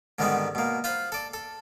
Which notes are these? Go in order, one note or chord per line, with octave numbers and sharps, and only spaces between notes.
G#2 D3 D#3 G3 B3 C4
B2 A#3
F4 C5 B5
A4 D5
A4